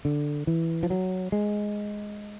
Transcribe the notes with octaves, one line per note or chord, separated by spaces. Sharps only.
D3
E3
F3
F#3
G#3